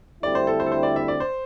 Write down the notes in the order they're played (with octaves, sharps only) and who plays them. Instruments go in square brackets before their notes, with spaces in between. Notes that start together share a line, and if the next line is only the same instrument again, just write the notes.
[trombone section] D2 D3 G3 C4 E4 [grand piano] D5
[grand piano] C5
A4
C5
A4
C5
D5
E5
D5
C5